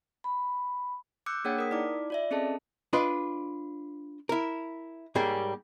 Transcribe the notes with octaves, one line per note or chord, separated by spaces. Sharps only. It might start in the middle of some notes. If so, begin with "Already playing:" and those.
B5
D6 E6 F#6 G6 C#7
A#3 D4 G#4 C#5 F#5 G5
A#4 D#6 B6
D#4 E4 D5 D6
F4 D5 E5
C4 C#4 G#4 A4 D#5 A5
D4 F4 B4 D#5
E4 A#4
G#2 G3 A#3 G#4 C#5